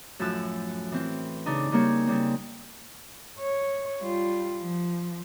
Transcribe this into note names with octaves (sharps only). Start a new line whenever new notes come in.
F#2 A2 F3 A4 E6 F#6
E3 C4
C#3 D4 D#4
C#3 G3 A#3 G4 C#5
C#3 G3 C4
C#5
G3 F4
F3